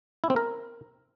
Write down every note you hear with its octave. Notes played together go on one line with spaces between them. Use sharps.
E4
C4
A#4